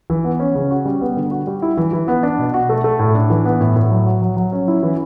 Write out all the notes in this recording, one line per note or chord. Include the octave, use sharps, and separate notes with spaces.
E3
B3
C#4
C#3
F#4
G3
B3
D3
F#4
G3
E4
E3
E3
B3
D4
B2
F#4
A3
A3
A2
D4
E3
B3
A2
A2
F#3
F#4
F#3
F#3
C#4
E4
E3